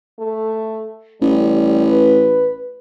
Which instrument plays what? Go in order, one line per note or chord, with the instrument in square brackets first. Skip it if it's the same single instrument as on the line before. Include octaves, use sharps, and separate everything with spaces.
[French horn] A3
[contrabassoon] A1 [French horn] G3
[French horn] B4